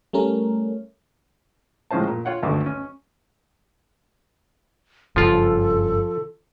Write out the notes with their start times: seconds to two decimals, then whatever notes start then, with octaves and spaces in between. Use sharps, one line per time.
0.13 G3 A3 C#4 A#4
1.91 A2 F3 G#3 C#4 C5 A5
2.07 A#2
2.25 F4 C#5 F#5 G5
2.43 G#1 D2 G2 A3 D6
2.66 C#4
5.16 F#1 G2 C#3 F3 F4 A4